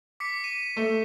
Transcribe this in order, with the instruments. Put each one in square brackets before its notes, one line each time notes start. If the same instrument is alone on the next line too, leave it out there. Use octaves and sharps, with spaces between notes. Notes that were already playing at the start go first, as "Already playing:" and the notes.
[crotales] D6 B6 C#7
D#7
[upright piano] A3